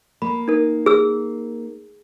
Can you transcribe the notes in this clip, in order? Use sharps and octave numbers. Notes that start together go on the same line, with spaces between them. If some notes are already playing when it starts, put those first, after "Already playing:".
A#3 B5
D#4 A#4
G#4 E6